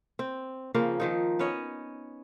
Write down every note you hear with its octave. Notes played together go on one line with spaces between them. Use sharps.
C4
C#3 F3 A#3 C4
D#3 F3 D#4
B3 C#4 C#5 D#5